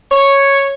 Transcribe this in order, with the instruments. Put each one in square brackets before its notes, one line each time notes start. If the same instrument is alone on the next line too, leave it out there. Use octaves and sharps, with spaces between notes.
[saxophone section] C#5